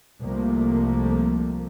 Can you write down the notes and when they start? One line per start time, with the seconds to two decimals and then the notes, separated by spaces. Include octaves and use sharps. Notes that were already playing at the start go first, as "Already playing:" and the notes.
0.22 C2 C3 F3 A3 A#3